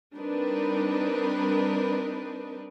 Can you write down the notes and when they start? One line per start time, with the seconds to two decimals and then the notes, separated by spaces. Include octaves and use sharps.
0.14 G3 C4 D4 D#4 A#4 B4